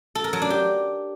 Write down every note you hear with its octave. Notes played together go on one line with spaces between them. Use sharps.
A4
A#4
F#3
D4
G4